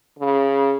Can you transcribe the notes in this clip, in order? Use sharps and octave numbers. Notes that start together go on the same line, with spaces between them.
C#3